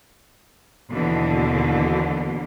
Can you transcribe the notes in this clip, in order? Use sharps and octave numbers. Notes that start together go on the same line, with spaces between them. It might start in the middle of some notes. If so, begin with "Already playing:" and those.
D#2 B2 D3 E3